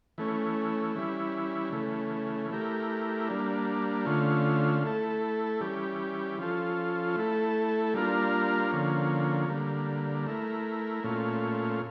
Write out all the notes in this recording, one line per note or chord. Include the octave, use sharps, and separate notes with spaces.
E3 A3 C#4
E3 G3 C#4 E4
C#3 E3 A3
A3 E4 G4 A#4
G3 A#3 D4
D3 A3 C#4 F4
A3 E4 A4
E3 G3 C#4 G4
F3 C#4 F4 A4
A3 E4 A4
G3 A#3 D4 F4 A#4
D3 F3 A#3 C#4
D3 G3 A#3
A3 E4 A#4
A#2 A3 C#4 F4